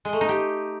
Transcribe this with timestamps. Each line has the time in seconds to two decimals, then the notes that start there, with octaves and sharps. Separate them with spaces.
0.05 G#3
0.13 A3
0.21 D#4
0.29 G4